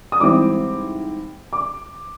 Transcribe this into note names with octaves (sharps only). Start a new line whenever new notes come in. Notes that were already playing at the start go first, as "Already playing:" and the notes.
D#6
G#2 E3 G3 C4 E4 D6
D6